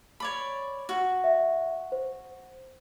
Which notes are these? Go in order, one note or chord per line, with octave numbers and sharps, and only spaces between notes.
C#5 D5 B5
F#4
E5
C5